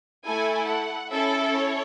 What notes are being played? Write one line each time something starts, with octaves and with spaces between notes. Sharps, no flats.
A3 E4 A4 G#5
F#5
C#4 E4 A4 E5
C#5